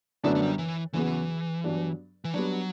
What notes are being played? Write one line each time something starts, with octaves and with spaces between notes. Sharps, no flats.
F#2 D3 F#3 A3 B3 D4
A3
G3
E3
E2 C#3 E3 F#3 B3 F#4
G2 F#3 B3 D4
E3
F#3 G3 B3 D4